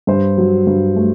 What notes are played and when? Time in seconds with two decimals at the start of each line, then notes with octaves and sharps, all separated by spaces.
0.07 G2 C5
0.38 F#3
0.67 G2
0.96 A3